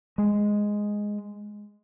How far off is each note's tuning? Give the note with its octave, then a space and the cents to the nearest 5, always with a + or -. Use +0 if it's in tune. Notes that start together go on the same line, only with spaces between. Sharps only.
G#3 +0